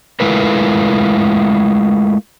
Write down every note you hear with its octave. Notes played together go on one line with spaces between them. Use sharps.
G#3 A3 E4 F4 A#4 B4